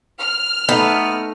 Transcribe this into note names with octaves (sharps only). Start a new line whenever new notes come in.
F6
A3 B3 D#4 A4